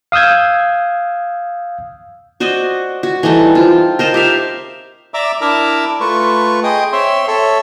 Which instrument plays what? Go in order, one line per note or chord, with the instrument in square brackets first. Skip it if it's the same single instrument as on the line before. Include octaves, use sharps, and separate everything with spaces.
[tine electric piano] F5 D#6 E6 G6 G#6
[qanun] F#4 C5 D5 D#5
F#4
E3 G3 D#4 A4
C4 F4
A#4 C5 D#5 A5
G4 E5 F5
[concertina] D5 E5 A#5 D6
D4 E4 A#4 E5 A#5 D6
A3 F4 B4 C#6
G#4 D#5 G5 D#6
C4 C#5 E5 C6
A4 C#5 E5